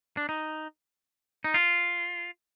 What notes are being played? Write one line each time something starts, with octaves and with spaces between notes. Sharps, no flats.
D4
D#4
D#4
F4